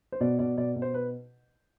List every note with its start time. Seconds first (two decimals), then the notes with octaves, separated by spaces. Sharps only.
0.12 C5
0.21 B2 D5
0.39 B2 D5
0.58 B2 D5
0.76 B2
0.82 C5
0.94 B4